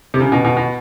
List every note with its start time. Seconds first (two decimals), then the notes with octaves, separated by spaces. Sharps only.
0.14 C3
0.20 C#3
0.32 B2
0.44 B2
0.57 B2